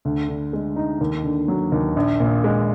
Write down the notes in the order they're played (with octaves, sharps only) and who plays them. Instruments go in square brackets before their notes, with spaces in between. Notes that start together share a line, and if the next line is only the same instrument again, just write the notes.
[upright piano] D2
D3
G#3
D#4
D#2
D3
F#3
D#2
A#1
A#2
G#3